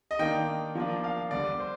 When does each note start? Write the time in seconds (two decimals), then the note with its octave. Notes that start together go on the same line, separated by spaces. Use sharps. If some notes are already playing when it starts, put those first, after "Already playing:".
0.11 D#5
0.19 D#3 A#3 D4 G5
0.75 F3 A#3 D4
1.04 F5
1.31 D3 G3 D4 D5
1.60 C5